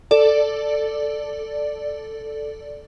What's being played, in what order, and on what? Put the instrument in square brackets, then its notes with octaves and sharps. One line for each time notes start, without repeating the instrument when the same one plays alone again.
[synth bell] A4 D5